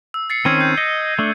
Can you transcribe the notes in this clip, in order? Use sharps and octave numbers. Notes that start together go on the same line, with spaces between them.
E6
A6 C7 C#7
D#3 C4 C#4 E6 G#6 D#7
G6
D#5 C#7
A3 D4